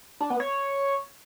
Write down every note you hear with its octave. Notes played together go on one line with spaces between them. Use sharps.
D4
B3
C#5